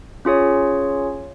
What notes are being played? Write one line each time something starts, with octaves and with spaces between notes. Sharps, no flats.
C#4 F4 G#4 C#5